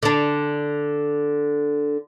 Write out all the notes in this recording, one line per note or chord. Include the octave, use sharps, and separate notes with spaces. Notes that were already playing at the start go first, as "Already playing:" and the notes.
D3 D4